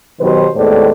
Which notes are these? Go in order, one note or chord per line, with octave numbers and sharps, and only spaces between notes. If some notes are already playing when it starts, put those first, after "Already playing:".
B2 D#3 F#3 G4 B4 C5
D#2 A2 G#3 B3 C5 D5